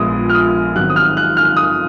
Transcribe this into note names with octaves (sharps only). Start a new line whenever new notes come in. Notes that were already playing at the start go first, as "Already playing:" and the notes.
Already playing: A#1 A#2 G#3 B3 D#6
F6
D#6
G#1 G#2 D#3 F#3 F#6
D#6
F6
F#6
F6
D#6